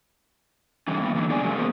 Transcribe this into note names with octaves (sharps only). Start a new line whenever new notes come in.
D3 E3 G3 C4
G3 A#3 B3
D3 E3 F#3 A#3
B3 D4 G#4 D5 G#5
C#3 F3 F#3 G#3 A#3
A#3 B3 G#4 A#4 C5